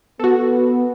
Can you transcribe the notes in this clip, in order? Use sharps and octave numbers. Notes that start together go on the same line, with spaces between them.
B3 F#4 A4